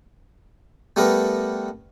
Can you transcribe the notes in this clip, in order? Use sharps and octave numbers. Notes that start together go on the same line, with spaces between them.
G3 A3 B3 A#4 B4